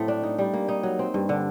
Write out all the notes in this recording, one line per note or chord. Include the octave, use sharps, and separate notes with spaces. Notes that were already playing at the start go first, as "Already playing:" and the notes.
Already playing: A2 F#3 A3 C4
D4
D#4
G3
A#3
D#4
F#3
C4
G2
D3